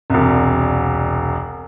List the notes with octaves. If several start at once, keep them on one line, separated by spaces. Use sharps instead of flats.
E1 C2